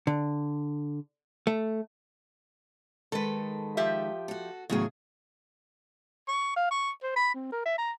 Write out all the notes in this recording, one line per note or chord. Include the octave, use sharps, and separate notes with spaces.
D3
A3
D#3 G#3 A4 B4
F3 G4 E5
F#4 A4
E2 A2 C#3 F#3 G#4
C#6
F5
C#6
C5
B5
C4
A#4
E5
A#5